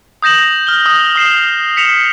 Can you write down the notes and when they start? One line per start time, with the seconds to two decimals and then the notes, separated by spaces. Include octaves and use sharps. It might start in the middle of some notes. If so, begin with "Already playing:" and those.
0.22 D#6 G6 A#6 E7 F#7
0.67 F6 G7
0.86 D#6
1.16 D#6 C7 E7
1.77 B6 C#7 E7 F7